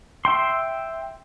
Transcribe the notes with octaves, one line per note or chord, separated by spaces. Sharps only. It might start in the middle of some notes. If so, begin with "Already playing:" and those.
E5 G5 C6